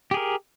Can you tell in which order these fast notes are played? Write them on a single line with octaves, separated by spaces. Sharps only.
G4 G#4 A#4